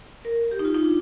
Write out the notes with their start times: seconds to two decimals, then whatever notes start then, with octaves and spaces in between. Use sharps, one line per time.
0.25 A#4
0.52 G4
0.59 D#4
0.65 F4
0.75 D#4
0.84 D4